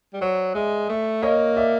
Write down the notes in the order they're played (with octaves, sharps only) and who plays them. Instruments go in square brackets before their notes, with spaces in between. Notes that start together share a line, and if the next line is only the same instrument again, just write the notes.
[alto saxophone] G3
[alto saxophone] F#3 [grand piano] C5 D5
[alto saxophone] G#3 [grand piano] D5 E5
[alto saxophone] A3
[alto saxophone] A#3 [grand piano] C#5 D#5
[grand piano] D5 E5